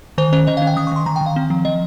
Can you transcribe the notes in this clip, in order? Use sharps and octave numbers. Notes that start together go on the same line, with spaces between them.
D#3 C5
C#4 C5
D#3 D#5
F5
C#4
G5
D#3 D#6
C#6
D#3 C6
D#3 A#5
G5
D#3
F5
C4
F3
F3 D#5